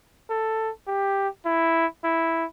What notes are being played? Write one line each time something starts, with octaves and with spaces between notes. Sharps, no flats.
A4
G4
E4
E4